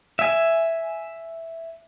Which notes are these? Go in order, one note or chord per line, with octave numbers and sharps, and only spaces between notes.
E5 G#5